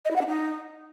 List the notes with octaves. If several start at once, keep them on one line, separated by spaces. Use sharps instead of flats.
D#5
E4
F#5
D4
D#4